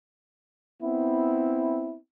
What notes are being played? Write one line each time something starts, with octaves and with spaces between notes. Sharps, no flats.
B3 C4 E4